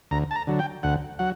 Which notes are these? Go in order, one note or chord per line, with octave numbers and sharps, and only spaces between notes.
D2 A#5
A5
A#5
D3 F#3
G5
D2 F#5
F#3 F#5